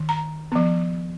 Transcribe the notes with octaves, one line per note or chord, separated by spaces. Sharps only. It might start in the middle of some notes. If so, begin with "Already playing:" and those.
Already playing: D#3
A#5
F3 B3